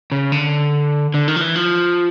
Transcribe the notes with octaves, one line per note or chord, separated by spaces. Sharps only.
C#3
D3
D3
D#3
F3
E3
F3